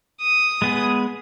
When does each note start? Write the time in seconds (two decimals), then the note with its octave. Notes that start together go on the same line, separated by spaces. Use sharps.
0.21 D#6 D#7
0.62 G#3 B3 G#4